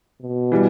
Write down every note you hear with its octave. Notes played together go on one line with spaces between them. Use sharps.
B2
E3 G3